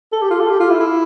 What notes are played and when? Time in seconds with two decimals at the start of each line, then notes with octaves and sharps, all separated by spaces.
0.12 A4
0.22 G4
0.30 F4
0.41 A4
0.50 G4
0.60 F4
0.70 E4
0.80 E4